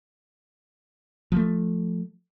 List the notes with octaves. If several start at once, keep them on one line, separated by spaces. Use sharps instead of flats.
F3 A3